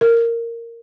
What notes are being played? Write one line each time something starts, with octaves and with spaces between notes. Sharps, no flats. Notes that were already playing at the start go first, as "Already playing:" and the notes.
A#4